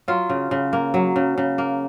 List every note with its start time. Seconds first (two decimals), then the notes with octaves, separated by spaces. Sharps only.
0.08 F#3 F4
0.30 C#3
0.51 C#3
0.73 A#3
0.94 F#3
1.16 C#3
1.38 C#3
1.58 A#3